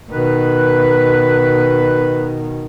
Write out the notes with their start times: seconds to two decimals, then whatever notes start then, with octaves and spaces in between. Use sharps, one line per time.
0.11 B2 D#3 B4